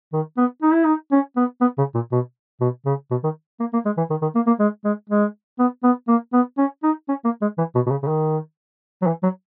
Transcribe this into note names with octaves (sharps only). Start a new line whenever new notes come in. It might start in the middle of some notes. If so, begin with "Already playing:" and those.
D#3
B3
D#4
E4
D#4
C#4
B3
B3
C#3
A#2
B2
B2
C#3
B2
D#3
A#3
A#3
G#3
E3
D#3
D#3
A#3
A#3
G#3
G#3
G#3
B3
B3
A#3
B3
C#4
D#4
C#4
A#3
G#3
E3
B2
B2
C#3
C#3
D#3
F#3
E3
F#3